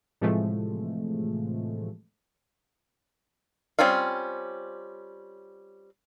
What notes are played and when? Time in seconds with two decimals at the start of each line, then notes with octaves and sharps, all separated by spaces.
0.21 A2 C3 E3 F3 G#3 A3
3.79 G3 C4 C#4 F4 F5